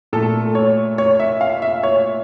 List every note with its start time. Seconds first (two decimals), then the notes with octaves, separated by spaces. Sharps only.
0.13 A#2 A3 A4
0.55 C#5
0.98 C#5
1.19 E5
1.41 F5
1.62 E5
1.83 C#5